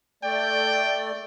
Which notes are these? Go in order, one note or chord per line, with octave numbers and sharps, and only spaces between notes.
A3 D5 G5